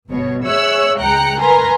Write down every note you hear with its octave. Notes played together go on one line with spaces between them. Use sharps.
G1 B2 C#5
G#4 C#5 E5 E6 F#6
C#2 G#3 G5 A#5 F#6 C#7
A#4 B4 G#5 A#5 C6